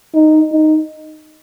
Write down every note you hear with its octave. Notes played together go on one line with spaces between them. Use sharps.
D#4
D#4